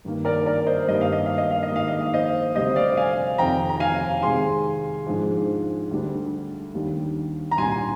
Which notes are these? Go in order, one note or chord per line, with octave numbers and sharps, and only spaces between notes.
G2 D#3 A#3
A#4 D5
A#4 D5
C5 D#5
G2 D#3 G3 A#3 D4 D#5
F5
D#5
F5
D#5
F5
D#5
G#2 D#3 A#3 F5
D#5
F5
C5 D#5
D2 C3 G3 C4 C5 D#5
D5 F5
F5 G#5
F2 C3 D#3 G5 A#5
A#5
F5 G#5
C3 D#3 G#3 G#5 C6
G#2 F3 G#3 D4
D2 D3 G3 D4
D#2 D#3 G3 D4
A#5
C2 A#2 G3 D4 G#5 C6